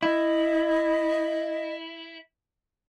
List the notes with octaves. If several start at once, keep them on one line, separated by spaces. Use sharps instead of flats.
E4 D#5